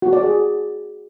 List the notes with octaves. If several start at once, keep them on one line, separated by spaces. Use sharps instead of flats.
F#4
D5
G#4